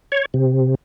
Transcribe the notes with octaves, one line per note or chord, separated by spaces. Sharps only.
C#5
C3